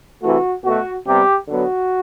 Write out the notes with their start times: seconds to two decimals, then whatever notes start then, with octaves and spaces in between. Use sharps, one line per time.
0.21 C3 E3 A3 F#4
0.64 B2 A3 F#4
1.06 C3 G3 B3 G4
1.48 D3 F#3 B3 F#4